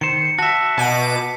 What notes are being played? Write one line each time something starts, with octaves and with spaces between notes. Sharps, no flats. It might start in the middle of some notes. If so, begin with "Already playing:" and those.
D#3 C5 C#7
F#4 E5 A5 B6
B2 D6 D#7